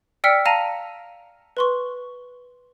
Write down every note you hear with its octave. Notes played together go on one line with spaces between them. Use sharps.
D5 G5 E6 F6 B6 C#7
F5 A5 A#5 A#6 D#7 F7
B4 C6 C#6